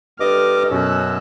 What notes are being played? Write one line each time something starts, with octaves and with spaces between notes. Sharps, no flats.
G2 A4 D#5 D6 F6
F#2 B2 C#4 E6 F#6